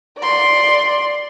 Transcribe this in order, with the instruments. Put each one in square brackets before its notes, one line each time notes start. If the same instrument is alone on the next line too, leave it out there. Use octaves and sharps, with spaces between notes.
[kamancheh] D5 C6